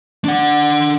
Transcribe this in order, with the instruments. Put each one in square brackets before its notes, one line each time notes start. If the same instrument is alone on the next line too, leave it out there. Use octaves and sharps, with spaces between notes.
[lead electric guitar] D4 F#5